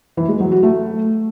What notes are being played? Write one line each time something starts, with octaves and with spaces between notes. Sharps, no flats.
E3
G#3
F#3
F#4
A3